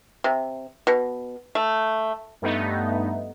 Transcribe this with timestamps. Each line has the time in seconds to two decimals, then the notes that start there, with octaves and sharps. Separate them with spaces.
0.24 C3
0.87 B2
1.55 A3
2.42 G2 A3 B3 D#4